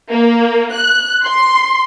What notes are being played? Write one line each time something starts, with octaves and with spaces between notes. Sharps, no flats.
A#3
F#6
C6